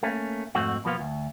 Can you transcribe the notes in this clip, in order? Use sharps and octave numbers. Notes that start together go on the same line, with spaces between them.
A3 A#3 C#4
F2 G#2 A3 C4 F#4
B2 F3 A#3 B3 F4
D2